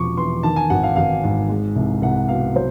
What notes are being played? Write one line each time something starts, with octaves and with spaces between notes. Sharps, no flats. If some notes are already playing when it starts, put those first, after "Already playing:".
Already playing: E1 C3 F3 C#6 D6
E2 C6
D#3 A5
G#5
G#1 F#5
F5
G#1 F5
G#2
G#3
C2
C2 F#5
B2 F5
F#3 C5